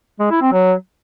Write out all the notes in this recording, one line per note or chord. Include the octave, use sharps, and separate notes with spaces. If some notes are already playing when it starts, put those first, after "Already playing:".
G#3
E4
C4
F#3